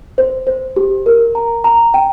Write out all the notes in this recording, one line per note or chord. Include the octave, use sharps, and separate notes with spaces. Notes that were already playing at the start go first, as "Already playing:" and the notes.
C5
C5
G4
A#4
A#5
A#5
G5